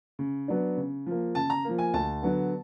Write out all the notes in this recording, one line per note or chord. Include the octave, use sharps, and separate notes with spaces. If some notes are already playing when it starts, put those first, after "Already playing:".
C#3
F#3 B3 D4
C#3
F3 A#3
C#3 A5
A#5
F3 A#3
G#5
D2 A5
D3 F#3 B3